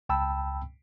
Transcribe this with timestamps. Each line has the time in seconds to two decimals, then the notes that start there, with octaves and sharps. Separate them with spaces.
0.09 C#2 G5 A5 B5 E6